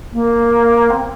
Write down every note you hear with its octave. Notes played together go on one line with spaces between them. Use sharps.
A#3
C4